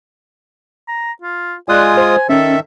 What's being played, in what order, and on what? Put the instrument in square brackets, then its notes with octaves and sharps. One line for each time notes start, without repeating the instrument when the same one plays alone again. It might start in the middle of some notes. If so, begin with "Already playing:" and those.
[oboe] A#5
F4
[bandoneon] G#3 F4 D#6 [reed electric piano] D5 F#6 [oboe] G#5
[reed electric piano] C5
[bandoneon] D#3 E5 [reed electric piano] C#4 [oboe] A4